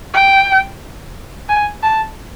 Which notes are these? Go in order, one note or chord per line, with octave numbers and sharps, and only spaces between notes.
G5
G#5
A5